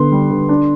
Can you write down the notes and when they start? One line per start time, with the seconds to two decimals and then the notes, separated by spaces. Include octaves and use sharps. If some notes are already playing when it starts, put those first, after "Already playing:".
Already playing: D3 B3 C6
0.12 G3
0.30 D3
0.49 D4